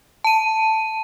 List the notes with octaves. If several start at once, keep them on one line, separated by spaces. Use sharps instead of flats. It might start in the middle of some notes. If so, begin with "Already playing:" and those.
A5 D#7